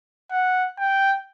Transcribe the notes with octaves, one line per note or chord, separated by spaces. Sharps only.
F#5
G5